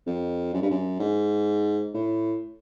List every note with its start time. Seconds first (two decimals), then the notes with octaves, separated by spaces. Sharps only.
0.06 F2
0.53 F#2
0.62 G2
0.71 F#2
1.00 G#2
1.94 A2